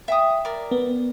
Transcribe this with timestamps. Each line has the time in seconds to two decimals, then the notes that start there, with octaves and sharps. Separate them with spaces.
0.08 E5 G5 D#6
0.45 A#4 D5
0.71 B3